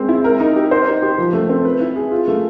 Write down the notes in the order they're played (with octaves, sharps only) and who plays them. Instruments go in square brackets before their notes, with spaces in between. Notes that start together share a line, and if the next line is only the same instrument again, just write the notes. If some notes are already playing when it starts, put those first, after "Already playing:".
Already playing: [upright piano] G#3 C4
E4
A#4
D#4
G4
C5
D#4
G4
F3
A3
C4
B4
E4
G#4
F4
A3